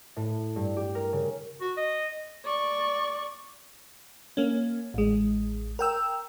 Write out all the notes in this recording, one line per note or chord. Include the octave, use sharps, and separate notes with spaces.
A2
G2
G4
A#4
C#3
F#4
D#5
D5 C#6
A#3 C#4
A1 G#3
A#4 G5 E6